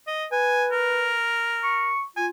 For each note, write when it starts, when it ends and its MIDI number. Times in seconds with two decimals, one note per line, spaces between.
0.07 0.25 75
0.32 1.15 71
0.32 0.66 80
0.72 1.92 70
1.63 2.02 85
2.16 2.30 65
2.16 2.26 80